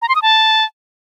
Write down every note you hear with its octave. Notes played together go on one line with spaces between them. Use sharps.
A#5
C6
D#6
A5